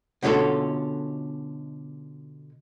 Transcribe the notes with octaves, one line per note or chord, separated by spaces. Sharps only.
B2 D3 C#4 F4 A4